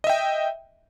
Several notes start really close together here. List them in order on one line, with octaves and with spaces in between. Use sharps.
D#5 E5 G5